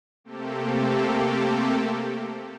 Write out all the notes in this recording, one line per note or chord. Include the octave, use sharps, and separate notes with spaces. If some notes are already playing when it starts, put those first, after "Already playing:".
C3 A3 A#3 C4 G4 A4